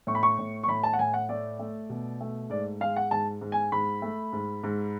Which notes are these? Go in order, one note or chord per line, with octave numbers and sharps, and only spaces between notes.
A2 C#6
B5
C#6
A2
C#6
A2 B5
A5
F#5
A2 G#5
F#5
A3 D5
A3
B2
A3
G#2 D5
G#3 F5
F#5
G#2 A5
G#2
G#5
G#2 B5
A3
G#2
G#2